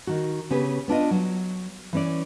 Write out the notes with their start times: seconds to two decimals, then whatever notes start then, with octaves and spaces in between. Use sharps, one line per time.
0.07 D#3 F#4
0.50 C#3 B3 C#4 G4 B4
0.88 B3 D4 F4 D#5
1.11 F#3
1.93 E3 C#4 D5